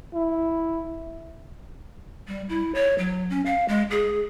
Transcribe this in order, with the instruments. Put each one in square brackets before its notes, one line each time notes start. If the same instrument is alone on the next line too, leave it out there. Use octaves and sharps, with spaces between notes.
[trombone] E4
[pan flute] G3
E4
C#5
F#3
C#4
F5
G#3
G#4